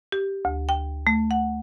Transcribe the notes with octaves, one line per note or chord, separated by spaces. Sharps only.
G4
D2
G5
A3
F#5